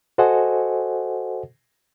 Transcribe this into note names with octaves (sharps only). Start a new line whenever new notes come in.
F#4 A4 C5 D#5 F#5 G#5